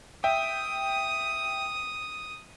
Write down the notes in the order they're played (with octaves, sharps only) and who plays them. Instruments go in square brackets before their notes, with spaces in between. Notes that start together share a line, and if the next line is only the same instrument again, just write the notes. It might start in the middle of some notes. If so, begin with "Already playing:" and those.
[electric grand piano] E5 G5 [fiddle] D#6